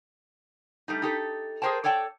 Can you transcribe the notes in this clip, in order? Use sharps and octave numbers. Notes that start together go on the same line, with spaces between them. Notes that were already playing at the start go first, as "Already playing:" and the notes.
G3 A3 D#4
D#4 G4 A4
G#4 A#4 C5 G5 A5
A4 C#5 D5 G5 A5